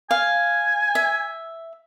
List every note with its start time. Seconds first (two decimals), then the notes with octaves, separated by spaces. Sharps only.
0.10 F5 G#5
0.95 E5